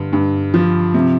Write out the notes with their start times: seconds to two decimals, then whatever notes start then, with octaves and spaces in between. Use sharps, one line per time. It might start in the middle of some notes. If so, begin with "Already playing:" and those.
Already playing: G2 D3
0.13 G2
0.54 F3
0.94 C3